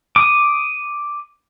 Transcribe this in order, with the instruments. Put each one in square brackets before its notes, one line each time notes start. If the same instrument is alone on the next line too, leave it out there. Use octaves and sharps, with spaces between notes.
[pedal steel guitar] D6 D#6